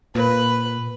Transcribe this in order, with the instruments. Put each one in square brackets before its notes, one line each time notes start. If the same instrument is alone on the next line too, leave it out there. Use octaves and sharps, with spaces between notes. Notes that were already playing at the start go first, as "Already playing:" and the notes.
[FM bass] A#2 [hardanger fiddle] B4